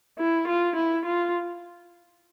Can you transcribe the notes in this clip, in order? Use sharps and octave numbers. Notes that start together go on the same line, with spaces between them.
E4
F4
E4
F4